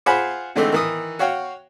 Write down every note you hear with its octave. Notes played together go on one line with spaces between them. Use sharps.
F4 G#4 C5 F#5 G#5 B5
D3 E3 G#3 A3 C4 D#4
D#3 E3 D#6
F#4 C#5 F5 G5